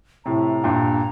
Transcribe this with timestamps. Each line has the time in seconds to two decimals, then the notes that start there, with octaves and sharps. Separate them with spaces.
0.25 A2 C3 A#5
0.64 G2 A#2